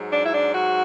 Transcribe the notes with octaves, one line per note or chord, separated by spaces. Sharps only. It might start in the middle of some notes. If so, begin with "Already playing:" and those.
Already playing: G#2 F#3
D4
E4
D4
F#4